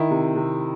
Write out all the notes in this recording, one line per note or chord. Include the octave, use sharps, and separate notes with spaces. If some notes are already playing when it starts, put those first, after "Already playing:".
Already playing: D#3 E4
C3
C3